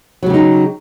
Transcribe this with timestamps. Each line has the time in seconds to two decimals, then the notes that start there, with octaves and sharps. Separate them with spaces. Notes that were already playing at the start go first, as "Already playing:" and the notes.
0.23 F#3
0.26 C#3
0.30 G4
0.34 D#4